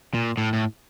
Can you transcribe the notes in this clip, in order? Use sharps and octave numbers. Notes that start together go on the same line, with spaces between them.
A#2
A2
A2